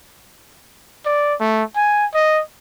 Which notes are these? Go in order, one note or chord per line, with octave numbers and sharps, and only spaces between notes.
D5
A3
G#5
D#5